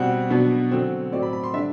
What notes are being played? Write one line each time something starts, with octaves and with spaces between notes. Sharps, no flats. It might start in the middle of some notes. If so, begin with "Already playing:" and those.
Already playing: B2 G3 C4 F#5
B2 F#3 B3 D4
D3 F#3 C4
A2 F#3 C4 D5
B5
B5
C6
D3 G3 D4 E5